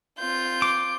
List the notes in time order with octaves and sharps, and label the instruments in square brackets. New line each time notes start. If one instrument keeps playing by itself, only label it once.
[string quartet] C4 F4 G6
[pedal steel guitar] D6